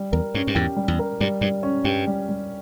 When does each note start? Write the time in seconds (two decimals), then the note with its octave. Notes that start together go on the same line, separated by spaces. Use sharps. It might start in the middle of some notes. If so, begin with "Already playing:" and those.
Already playing: G3
0.12 E2 A#4
0.34 G2 C#4
0.47 G2
0.55 E2 G#2 G4
0.76 G3
0.88 E2
0.99 A#4
1.20 G2 G3
1.41 G2 G3
1.63 C#4
1.84 G2 G4
2.07 G3
2.29 G3